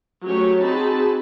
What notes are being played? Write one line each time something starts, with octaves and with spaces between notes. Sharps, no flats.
F#3 A3 C#4 G4 C#5
C4 D#4 F#4 G#4 A5 B5